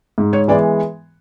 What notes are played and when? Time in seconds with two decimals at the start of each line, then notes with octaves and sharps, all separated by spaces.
0.18 G#2
0.33 C#5
0.48 E3 G#3 B3 D5